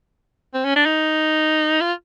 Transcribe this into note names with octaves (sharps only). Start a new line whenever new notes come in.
C4
C#4
D4
D#4
F4